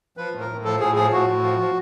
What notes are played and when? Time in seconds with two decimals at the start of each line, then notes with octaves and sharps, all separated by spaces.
0.17 F3 B4
0.32 A2
0.41 A#4
0.48 A2
0.65 F3 A4
0.80 A2 G#4
0.96 F3 G#4
1.12 A2 F#4
1.27 A2
1.43 F3
1.59 F3